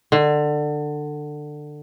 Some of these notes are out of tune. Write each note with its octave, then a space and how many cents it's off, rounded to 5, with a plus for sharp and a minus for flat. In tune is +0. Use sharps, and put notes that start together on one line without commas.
D3 +20